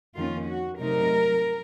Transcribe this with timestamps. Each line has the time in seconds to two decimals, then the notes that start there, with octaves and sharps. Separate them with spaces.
0.16 F2 D#3 A#3 C#4 F4
0.48 F#4
0.79 C3 F#3 A3 D#4 A#4